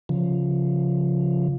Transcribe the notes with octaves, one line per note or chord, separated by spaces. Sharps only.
C#3 F3